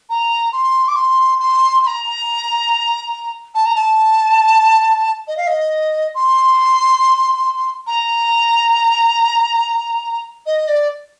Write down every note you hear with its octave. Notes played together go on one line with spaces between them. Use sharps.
A#5
C6
D6
C6
C6
C6
A#5
A5
A#5
A5
D#5
F5
D#5
C6
A#5
D#5
D5